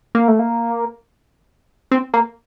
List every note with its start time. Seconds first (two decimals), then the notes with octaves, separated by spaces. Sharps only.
0.15 A#3
0.28 A3
0.39 A#3
1.91 C4
2.14 A#3